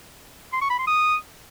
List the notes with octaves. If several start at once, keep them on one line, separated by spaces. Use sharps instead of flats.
C6
C#6
B5
C6
D#6